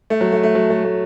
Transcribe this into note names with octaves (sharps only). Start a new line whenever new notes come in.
A3
F#3
A3
A3
F#3
A3
A3